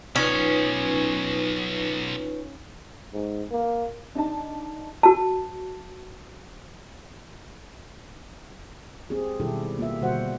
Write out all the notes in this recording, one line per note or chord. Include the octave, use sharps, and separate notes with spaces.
B1 C#4 D#4 F4 B4
G#2
A#3
D4 D#4 A5
F#4 A5
C4 G4 G#4
B2 D#3 G3 E4 G4 A4
A#3 F4 G4 E5
B2 D3 G3 F#4 C5 F#5